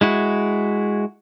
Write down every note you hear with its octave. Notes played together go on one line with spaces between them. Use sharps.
G#3 E4 F#4